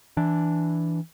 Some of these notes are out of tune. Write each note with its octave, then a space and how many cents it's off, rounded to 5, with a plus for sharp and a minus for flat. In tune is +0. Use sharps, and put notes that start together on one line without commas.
E3 +0 D4 +0